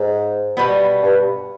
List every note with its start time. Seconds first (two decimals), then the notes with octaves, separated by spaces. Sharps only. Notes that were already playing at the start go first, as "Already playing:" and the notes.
Already playing: G#2
0.57 B2 G3 B3
1.03 G2